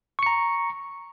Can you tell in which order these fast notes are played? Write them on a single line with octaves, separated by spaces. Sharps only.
C#6 C#7 A#5